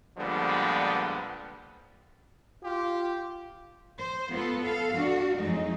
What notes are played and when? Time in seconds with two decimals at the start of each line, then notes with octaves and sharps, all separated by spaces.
0.18 A#2 D3 F3 G3 G#3 B3
2.64 F4 G4
3.99 C5
4.32 B3 F4 A4
4.63 A4 F5
4.96 D4 F#4
5.39 F2 F#3 G#3 A3 D#4